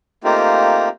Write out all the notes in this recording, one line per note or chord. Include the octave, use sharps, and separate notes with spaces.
A3 A#3 C4 D#4 F4 G4